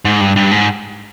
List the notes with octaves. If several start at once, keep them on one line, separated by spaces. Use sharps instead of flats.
G#2
G2
G2
G#2